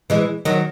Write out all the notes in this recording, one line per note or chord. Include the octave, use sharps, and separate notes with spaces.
E3 G#3
D#3 F#3